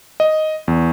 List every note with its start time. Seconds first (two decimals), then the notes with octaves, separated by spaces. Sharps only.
0.20 D#5
0.68 E2